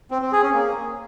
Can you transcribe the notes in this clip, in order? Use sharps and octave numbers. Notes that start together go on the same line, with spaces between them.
C4
C4
G#4
C#4
A#3